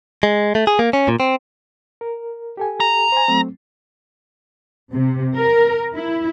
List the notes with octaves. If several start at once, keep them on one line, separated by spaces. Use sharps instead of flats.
G#3
A3
G#4
A#3
C#4
A#2
C4
A#4
G4 A4 G#5
A#5
C5 G#5
F#3 A3 C4
C3
A#4
E4